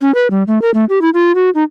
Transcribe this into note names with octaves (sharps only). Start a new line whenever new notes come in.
C#4
B4
G3
A3
A#4
A3
G4
E4
F4
F#4
D#4